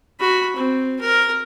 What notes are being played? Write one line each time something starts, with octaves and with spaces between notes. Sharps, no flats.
F#4 B5
C4
A#4